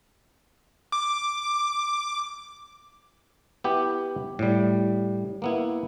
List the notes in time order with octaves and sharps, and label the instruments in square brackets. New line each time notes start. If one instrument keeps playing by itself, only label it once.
[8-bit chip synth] D6
[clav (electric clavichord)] B3 E4 G4
A2 G3
A#3 B3 E4